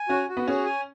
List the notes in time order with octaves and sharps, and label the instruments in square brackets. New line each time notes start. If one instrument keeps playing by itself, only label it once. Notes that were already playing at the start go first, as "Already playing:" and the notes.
Already playing: [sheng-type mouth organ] G#5
[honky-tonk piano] C#4 [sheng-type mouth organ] F#4
[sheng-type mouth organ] F#4
[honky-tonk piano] B3
[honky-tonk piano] C#4 [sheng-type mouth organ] G#4
[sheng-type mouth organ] G#5